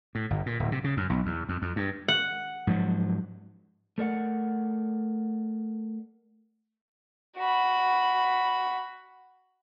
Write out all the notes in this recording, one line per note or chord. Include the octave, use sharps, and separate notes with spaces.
A2
G1
A#2
D1
C3
C#3
F#2
B1
E2
F2
F2
G2
F#5
G#2 F3 F#3
A3 A#4 D5 F#5
F#4 B5